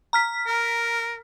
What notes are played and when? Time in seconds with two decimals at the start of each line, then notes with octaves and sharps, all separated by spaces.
0.13 A#5 F6 B6
0.47 A#4